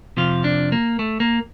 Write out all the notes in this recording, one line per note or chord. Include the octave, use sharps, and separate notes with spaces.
F2 C3 F3 F4
D4
A#3
A3
A#3